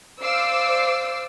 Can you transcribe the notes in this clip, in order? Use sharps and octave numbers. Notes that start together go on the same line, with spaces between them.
C5 D5 F5 D6 E6 C7